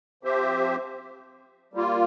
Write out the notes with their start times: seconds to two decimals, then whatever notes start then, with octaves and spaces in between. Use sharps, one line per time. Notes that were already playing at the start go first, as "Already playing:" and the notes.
0.23 F3 C4 G4 C5 E5
1.74 G3 A#3 F4